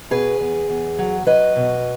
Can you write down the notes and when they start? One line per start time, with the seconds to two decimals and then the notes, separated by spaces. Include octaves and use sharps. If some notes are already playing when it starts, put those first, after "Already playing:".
0.11 B2 G#4 B4
0.40 E2
0.69 E2
0.99 F#3
1.26 F#3 B4 D#5
1.56 B2